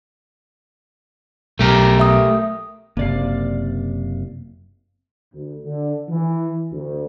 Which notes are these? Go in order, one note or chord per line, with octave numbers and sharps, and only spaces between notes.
B1 A3 G4 A#4
E5 D#6
F#1 C3 A#3 D5 F5
D2
D3
E3
D2